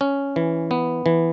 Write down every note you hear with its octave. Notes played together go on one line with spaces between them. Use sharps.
C#4
E3
B3
E3